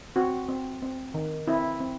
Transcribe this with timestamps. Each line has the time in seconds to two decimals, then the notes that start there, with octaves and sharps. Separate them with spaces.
0.16 C4 F#4
0.49 C4
0.82 C4
1.14 D#3
1.47 C4 E4
1.80 C4